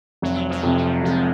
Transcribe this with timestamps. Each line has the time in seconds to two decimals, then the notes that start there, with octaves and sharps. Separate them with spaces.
0.22 F1 F#3
0.50 F3
0.63 F2 C3
0.76 F#3
1.03 F1 G#3